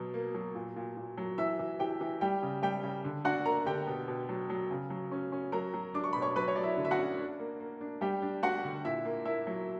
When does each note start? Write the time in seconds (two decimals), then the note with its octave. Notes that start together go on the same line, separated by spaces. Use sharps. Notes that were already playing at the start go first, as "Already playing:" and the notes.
Already playing: B2 F#3
0.14 A#3
0.34 F#3
0.55 A#2
0.76 A#2
0.97 A#2
1.17 F#3
1.38 E3 E5 E6
1.59 E3
1.79 E3 G4 G5
2.01 E3
2.21 G3 G4 G5
2.42 C#3
2.62 G3 G4 G5
2.83 C#3
3.04 D3
3.25 D4 F#4 F#5
3.45 A#3 A#4 A#5
3.66 D3 G4 G5
3.87 B2
4.08 B2
4.29 F#3
4.50 F#3
4.70 C#3
4.90 F#3
5.12 C#4
5.32 C#4
5.52 F#3 A#4 A#5
5.73 F#3
5.94 D4 D6
6.04 C#6
6.13 B2 B5
6.22 C#5 C#6
6.36 F#3 B4 B5
6.48 C#5
6.55 F#3 D5
6.63 E4 E5
6.77 D3
6.85 E5
6.91 F#4 F#5
6.98 C#4
7.18 D4
7.39 A#3
7.60 A#3
7.81 D4
8.01 G3 G4 G5
8.22 D4
8.43 D4 F#4 F#5
8.64 D3
8.84 A#2 E4 E5
9.05 A#3
9.25 A#3 E4 E5
9.47 F#3